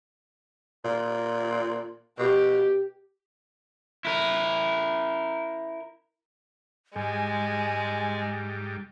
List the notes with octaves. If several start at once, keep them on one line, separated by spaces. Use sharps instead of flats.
A#2
B2 G4
E4 A#4
G#2 G3 G#3 G#5